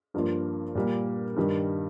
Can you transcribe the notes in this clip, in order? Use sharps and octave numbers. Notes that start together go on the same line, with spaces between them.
G2 F3 A#3 F4
A#2 G3 A#3
G2 D#3 G3